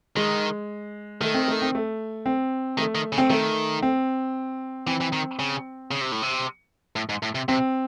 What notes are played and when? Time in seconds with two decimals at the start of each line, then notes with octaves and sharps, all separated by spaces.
0.16 D#3 G#3
1.21 D#3 A3
1.34 C4
1.48 A3
1.62 C4
1.75 A3
2.26 C4
2.78 D#3 A3
2.95 D#3
3.12 C#3
3.18 C4
3.30 D#3 A3
3.82 C4
4.87 E3 C4
5.01 E3
5.13 D#3
5.39 C#3
5.91 C#3
6.01 C3
6.12 A2
6.22 C3
6.96 A2
7.09 G#2
7.23 A2
7.35 C3
7.48 C3 C4